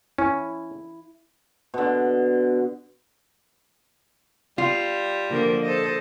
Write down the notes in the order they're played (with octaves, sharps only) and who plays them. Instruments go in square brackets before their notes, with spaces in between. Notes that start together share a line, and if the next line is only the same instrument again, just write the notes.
[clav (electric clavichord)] C#4 [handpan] E4
[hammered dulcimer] B2 D3
[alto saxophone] G3 [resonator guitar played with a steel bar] F4
[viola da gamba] D3 F3 A#3
A4 C5 D#5